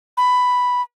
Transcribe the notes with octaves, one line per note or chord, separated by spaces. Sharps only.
B5